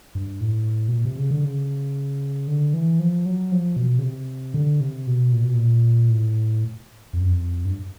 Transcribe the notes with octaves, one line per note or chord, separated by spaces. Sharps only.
G2
A2
B2
A#2
C3
C#3
D3
C#3
D3
E3
F3
F#3
F3
B2
C#3
C3
D3
C3
B2
A#2
B2
A#2
A2
F2
F#2
F2
G2